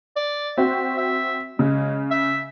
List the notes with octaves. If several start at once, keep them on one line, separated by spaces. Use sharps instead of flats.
D5
C4 F#4 E5
E5
C#3 G#3
E5